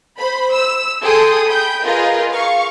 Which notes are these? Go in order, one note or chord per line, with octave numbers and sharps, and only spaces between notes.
C5 B5
E6
G#4 A4 G5 C6 D#6
G5 B5 G6
F4 G#4 A#4 B4 D#5
F5 C#6